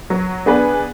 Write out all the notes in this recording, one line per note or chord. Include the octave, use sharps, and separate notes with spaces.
F#3
B3 D4 G#4 B4